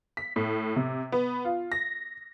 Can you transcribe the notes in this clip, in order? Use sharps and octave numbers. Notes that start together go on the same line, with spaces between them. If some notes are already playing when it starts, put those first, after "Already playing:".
B6
A2
C3
B3
F4
A#6